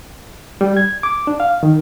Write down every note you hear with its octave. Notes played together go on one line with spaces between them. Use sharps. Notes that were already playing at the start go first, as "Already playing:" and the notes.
G3
G#6
D6
D4
F5
D#3